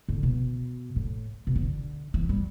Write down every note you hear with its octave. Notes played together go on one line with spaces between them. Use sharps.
D3
B2
A2
B2
D3
E3
G3